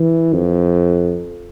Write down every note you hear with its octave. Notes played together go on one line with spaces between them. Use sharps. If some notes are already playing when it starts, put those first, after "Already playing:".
Already playing: E3
F2